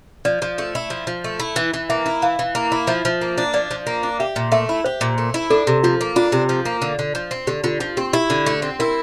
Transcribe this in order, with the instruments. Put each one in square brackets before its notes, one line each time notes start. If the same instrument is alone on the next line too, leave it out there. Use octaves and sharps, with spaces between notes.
[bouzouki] F3 [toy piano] D5
[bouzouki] F3
A3
E4
F3
F3
A3
E4
[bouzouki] E3 [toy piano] E5
[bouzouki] E3
[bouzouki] A#3 [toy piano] E5
[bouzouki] E4
[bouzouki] E3 [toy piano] F5
[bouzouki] E3
A#3
E4
[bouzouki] F3 [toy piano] E5
[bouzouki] F3
A#3
D4
[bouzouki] F3 [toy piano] D5
[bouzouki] F3
A#3
D4
[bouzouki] G4 [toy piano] E5
[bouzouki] A#2
[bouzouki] A3 [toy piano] E5
[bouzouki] E4
[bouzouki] G4 [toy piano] C5
[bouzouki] A#2
A3
E4
[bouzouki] D4 [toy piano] A4
[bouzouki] C3
[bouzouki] F3 [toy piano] F4
[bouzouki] A#3
[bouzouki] D4 [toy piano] F4
[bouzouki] C3
F3
A#3
D3
D3
F3
C4
[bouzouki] D3 [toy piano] G4
[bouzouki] D3 [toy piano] F4
[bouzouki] F3
[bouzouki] C4 [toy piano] G4
[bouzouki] E4 [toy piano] G4
[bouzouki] D3
A3
C4
[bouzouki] E4 [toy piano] A#4